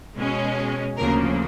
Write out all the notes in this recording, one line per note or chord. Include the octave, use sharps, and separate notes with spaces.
B2 G#3 C#4
D2 C#3 F3 A#3 A#4